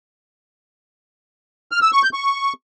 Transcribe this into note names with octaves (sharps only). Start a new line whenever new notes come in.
F6
E6
C#6
G6
C#6